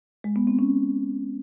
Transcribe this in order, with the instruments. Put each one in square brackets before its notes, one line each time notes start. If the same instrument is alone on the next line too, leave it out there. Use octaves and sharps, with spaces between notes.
[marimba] G#3
B3
C4
C#4